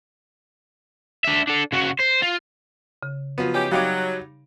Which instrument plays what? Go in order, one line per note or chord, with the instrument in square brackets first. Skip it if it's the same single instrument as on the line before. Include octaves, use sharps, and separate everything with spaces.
[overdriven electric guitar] D4 E5
D4 A4
C#3 F#4
C5
F4
[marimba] C#3
[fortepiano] F3 F#3 B3
[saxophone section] C#4 D#4 G4 [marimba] C#5
[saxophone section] F#3 [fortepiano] G3 D#4 D6 [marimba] F5 G5